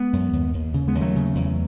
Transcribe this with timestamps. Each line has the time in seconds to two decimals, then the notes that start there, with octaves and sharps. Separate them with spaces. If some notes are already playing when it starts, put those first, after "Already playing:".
Already playing: G#3 B3
0.13 F#2
0.33 D#2
0.54 D#2
0.74 C#3
0.88 G#3 B3
0.95 D#2
1.01 F#3 A3
1.15 C#3
1.35 E2